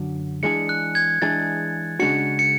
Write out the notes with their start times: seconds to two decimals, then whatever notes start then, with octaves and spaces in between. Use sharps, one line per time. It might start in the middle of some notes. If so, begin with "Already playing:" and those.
Already playing: F#2 D3 F#3
0.43 E3 G#3 D4 G#4 C#7
0.69 F#6
0.95 G#6
1.22 E3 G#3 D4 G#4 A6
2.00 C#3 G#3 D4 F#4 C#7
2.39 C#7